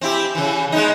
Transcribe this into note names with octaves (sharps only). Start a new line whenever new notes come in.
C4 E4 G4
C#3 E3
G#3 B3 D#4